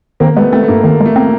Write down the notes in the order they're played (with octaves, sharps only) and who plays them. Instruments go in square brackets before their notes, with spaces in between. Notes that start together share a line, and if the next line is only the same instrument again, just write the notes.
[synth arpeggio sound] D#3 [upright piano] A#3 C4
[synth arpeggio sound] G#3 [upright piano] A3 B3
[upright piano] A3 [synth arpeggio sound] C4
[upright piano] A3
[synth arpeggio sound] G2 [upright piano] A#3
[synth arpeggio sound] D#3 [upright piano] A#3
[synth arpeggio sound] G#3 [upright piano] A3
[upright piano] A#3 [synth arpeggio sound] C4